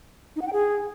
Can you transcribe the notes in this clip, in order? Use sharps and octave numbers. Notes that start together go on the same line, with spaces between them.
D#4
F#5
G5
G#4